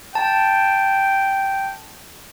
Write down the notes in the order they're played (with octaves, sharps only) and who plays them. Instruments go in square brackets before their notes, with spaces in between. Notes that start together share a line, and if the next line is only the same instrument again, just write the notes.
[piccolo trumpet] G5 [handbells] A5